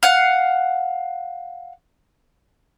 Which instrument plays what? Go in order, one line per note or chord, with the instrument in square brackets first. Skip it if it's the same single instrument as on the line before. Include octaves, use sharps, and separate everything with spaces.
[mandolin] F5 F#5